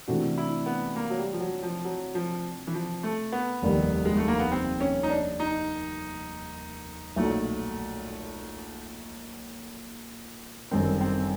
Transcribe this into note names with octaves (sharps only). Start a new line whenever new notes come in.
C3 E3 A3 D4 F#4
E4
B3
A#3
F#3
G3
F3
F#3
F3
F#3
F3
E3
F3
A3
B3
F1 D#2 D#3 G3
G#3
A3
A#3
B3
C4
C#4
D#4
D4
D#4
B1 A#2 F#3 A3
G1 F#2 D#3 C4
C4